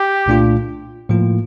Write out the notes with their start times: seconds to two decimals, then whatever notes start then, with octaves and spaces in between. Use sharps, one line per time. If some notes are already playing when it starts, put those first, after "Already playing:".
Already playing: G4
0.26 C2 A#2 A3 D4 F4
1.09 A2 F3 A#3 F4